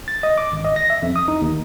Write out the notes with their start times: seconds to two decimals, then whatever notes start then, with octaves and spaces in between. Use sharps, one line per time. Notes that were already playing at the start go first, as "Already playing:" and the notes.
0.08 A6
0.23 D#5
0.38 D6
0.52 G#1
0.65 D#5
0.76 A#6
0.90 E5
1.02 F2
1.16 D#6
1.28 D#4
1.41 D#2